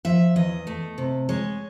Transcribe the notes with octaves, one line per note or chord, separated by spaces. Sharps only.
F3 E5
E2 D#5
A3
C3
G#3 C#5